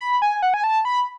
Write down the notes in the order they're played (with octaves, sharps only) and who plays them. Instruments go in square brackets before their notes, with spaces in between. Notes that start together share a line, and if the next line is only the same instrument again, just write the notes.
[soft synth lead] B5
G#5
F#5
G#5
A5
B5